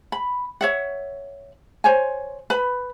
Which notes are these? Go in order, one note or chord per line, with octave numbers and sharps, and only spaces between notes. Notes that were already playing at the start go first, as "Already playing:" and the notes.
B5
C#5 E5 F#5
C5 C#5 G#5
B4 B5